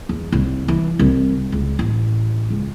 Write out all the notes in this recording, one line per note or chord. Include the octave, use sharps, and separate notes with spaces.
E2
C2
E3
C2
C#2
A1
C#2